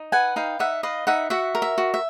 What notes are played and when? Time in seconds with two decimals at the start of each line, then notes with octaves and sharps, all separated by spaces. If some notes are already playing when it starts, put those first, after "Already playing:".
Already playing: D#4
0.12 B4 F#5 G#5
0.36 D#4 F5 G5
0.59 D#4 E5 F#5
0.83 B4 D#5 F5
1.07 D#4 E5 F#5
1.30 F#4 E5 F#5
1.55 A#4
1.62 E5
1.78 F#4
1.94 E5